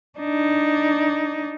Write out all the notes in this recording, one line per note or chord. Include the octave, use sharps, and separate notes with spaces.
D4 D#4